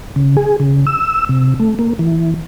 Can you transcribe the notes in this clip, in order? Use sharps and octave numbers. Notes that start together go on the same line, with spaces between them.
C#3
G#4
C#3
E6
C3
A3
A#3
E3